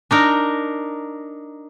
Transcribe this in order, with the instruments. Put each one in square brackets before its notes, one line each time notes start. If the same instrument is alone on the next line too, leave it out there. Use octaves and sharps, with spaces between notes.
[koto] D4 D#4 A#4